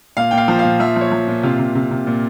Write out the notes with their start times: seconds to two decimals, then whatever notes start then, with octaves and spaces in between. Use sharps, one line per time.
0.17 A#2 F5
0.31 A#2 G5
0.38 F5
0.48 F3
0.59 F5
0.64 A#2
0.80 F3 E5
0.96 F3
1.01 C#5
1.12 F3
1.28 A#2
1.43 C3 F4
1.59 C3
1.75 C3
1.91 C3
2.07 A#2